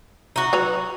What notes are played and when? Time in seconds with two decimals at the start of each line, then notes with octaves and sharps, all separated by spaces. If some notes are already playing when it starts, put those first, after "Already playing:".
0.36 D#4 F#4
0.53 F#3 B4 A#5